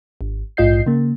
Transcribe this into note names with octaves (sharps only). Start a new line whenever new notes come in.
G#1
A#1 G#2 F4 D#5 G6 C7
C#3 A#3